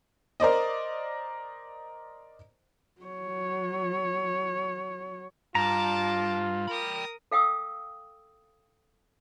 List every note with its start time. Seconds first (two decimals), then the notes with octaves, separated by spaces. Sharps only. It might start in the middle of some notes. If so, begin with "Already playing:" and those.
0.40 A#4 C5 D5 D#5
3.02 F#3 C#5
5.55 G2 F4 A5 A#5 D6
6.68 A#4 G5 B5 D#6
7.31 A4 F5 G5 D#6 E6